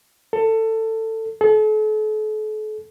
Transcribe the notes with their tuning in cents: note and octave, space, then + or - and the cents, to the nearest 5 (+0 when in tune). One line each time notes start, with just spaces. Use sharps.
A4 +20
A4 -40